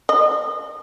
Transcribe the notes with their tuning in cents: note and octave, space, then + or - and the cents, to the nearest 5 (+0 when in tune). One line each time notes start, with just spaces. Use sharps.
D#5 -35